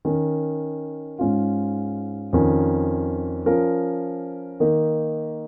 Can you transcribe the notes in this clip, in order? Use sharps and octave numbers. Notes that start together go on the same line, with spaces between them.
D#3 C#4 A#4
G#2 G#3 C#4 F4
F2 D#3 C#4
F3 C#4 A#4
D#3 A#3 D#4 A#4